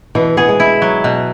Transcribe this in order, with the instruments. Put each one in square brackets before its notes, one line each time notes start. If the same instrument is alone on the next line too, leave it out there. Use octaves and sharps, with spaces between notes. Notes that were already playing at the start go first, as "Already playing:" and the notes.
[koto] B2 [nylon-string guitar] E3
[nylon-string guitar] B3 [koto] G#4
[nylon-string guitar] G#3
[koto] E4
F#3
B2